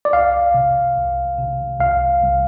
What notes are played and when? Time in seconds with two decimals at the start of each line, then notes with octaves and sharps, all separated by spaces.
0.05 D5
0.13 C2 F5
0.54 C3
0.97 C2
1.38 C3
1.80 C2 F5
2.22 C2